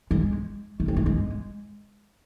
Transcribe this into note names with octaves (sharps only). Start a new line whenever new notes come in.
G#3
A3
C4
A3
G#3